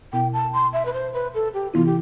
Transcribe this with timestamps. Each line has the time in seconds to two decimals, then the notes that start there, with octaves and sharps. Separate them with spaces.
0.13 B2 B3 E4 G5
0.33 A5
0.53 C6
0.73 E5
0.85 B4
0.93 C5
1.13 B4
1.34 A4
1.54 G4
1.73 C3 E3 B3 E4 F4
1.86 G4